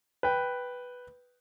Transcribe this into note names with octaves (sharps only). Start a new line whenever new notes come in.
B4 G5